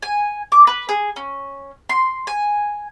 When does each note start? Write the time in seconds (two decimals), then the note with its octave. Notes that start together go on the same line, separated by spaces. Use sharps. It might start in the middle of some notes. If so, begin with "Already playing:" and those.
0.03 G#5
0.52 D6
0.67 B4
0.89 G#4
1.16 C#4
1.89 C6
2.27 G#5